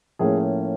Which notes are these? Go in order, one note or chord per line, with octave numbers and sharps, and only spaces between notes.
A2 F3 A#3 C#4 G#4